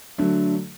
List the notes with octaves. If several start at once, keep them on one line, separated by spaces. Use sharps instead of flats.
D3 F#3 A3